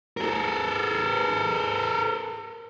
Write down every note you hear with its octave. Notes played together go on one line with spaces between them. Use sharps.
A4 A#4